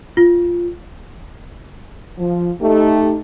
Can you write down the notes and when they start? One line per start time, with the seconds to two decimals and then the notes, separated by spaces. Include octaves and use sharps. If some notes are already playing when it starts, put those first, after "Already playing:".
0.17 F4
2.18 F3
2.61 A3 D#4 G4